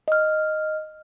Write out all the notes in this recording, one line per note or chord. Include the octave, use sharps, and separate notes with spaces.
D#5 F6